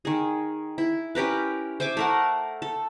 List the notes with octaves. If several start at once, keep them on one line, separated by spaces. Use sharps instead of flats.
D#3 G#4
E4
C#4 G4 A#4 B4
C5 E5 G#5 D6
A3 A#4 F#5
A4